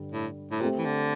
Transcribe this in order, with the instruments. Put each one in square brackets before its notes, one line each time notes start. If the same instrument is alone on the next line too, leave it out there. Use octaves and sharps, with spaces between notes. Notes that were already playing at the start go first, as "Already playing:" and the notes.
Already playing: [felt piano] G2 D3 G3
[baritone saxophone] A2
A2
[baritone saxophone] A#2 [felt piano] A3 C4 G4 C5
[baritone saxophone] E3
D3